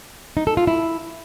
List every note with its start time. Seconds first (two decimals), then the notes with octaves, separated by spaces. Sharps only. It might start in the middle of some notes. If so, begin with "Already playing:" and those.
0.37 D#4
0.47 A4
0.57 F4
0.67 E4